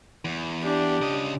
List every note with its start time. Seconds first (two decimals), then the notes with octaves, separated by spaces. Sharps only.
0.25 E2
0.62 D4 G4
1.02 C#3 D#5